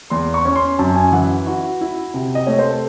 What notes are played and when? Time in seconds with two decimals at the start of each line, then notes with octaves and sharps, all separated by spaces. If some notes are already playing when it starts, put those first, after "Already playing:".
0.10 E2 C6
0.34 C#6
0.45 C#4
0.56 C6
0.79 F#2 A5
0.96 G#5
1.12 E3 F#5
1.47 E4 F#4
1.81 E4
2.14 C3
2.35 D#5
2.47 A3 C#5
2.59 C5
2.70 A4